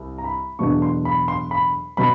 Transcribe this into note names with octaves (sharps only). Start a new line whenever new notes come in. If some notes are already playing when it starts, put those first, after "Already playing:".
Already playing: C2
A#5
B5
E2 B2 F#3 A3 D4 C#6
C6
B5
C6
B5
B2 F#3 B5